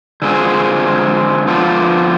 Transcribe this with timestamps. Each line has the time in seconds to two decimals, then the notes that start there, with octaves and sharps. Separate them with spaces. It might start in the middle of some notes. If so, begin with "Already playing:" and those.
0.22 D3 G#3 C4 F4 G#4
1.47 D3 F3 B3 F4